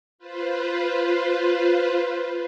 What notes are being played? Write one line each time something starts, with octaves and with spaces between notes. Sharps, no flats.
F4 B4 C5